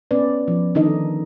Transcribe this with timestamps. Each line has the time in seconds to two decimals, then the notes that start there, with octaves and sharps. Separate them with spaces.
0.11 B3 C#4 B4 D5
0.48 F3
0.75 D3 D#3 D4 D#4 A4 D#5